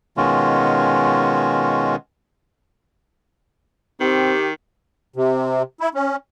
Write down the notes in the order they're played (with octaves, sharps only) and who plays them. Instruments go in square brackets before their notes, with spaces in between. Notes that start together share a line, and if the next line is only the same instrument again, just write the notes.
[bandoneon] B2 D#3 G#3 C#4 F4 F#4
[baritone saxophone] D#3 [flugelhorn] C4 [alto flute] G4
[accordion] C3
E4
C#4